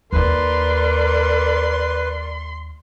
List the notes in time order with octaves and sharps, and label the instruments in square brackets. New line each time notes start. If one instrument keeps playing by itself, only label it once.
[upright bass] D#2 A#3 [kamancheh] A#4 D5 [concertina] B4 [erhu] C6